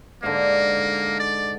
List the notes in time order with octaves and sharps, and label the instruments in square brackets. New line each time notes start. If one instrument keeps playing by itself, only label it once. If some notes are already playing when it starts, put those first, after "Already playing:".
[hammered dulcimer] G#2 D3 [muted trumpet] A#3
[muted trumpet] D5